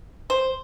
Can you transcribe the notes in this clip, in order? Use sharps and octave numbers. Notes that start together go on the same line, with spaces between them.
C5